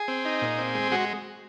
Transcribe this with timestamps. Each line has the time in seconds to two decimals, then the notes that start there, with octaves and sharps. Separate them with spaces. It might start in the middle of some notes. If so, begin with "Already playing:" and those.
Already playing: G#4
0.08 C4
0.25 D#4
0.42 A#2
0.59 C4
0.75 G#3
0.92 G#3 F#4